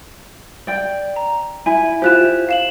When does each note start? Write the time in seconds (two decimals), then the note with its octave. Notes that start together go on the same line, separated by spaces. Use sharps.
0.67 D5 G5
1.16 A#5
1.66 E4 G#5
2.02 E4 F4 G4 C5 F#6 E7
2.49 F5 E7 F#7